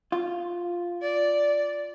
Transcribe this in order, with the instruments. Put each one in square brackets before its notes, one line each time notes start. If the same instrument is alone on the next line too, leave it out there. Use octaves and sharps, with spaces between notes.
[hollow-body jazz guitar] F4
[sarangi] D5